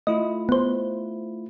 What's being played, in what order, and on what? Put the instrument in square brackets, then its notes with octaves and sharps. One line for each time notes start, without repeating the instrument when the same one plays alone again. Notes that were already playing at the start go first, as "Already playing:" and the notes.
[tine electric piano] A3 E4 F4 [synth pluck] D#5
[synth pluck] B3 C5